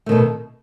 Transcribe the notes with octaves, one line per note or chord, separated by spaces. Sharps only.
B2 D#3 A3